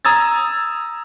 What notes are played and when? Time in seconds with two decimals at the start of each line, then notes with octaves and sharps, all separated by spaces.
0.05 A#5 D#6 E6 G#6 A6